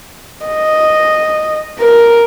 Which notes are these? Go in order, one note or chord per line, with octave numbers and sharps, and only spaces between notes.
D#5
A#4